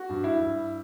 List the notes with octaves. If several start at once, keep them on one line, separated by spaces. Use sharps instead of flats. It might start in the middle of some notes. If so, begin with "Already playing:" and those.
Already playing: F#4
G2
E4
G2